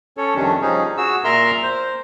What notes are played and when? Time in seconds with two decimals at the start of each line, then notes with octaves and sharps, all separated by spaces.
0.17 C#4 A4 C#5
0.35 F2 C3 D#3 G3 C#4 D4
0.61 F3 G3 C#4 D#4 G#4
0.97 F#4 G#4 E6
1.24 A#2 A#4 E5 A#5 C6 F6
1.63 C5